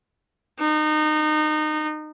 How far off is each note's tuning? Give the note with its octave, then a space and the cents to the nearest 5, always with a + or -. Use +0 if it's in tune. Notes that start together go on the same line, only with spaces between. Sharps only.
D#4 -25